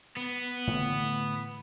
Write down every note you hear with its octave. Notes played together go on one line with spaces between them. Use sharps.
B3
A2 D3 E3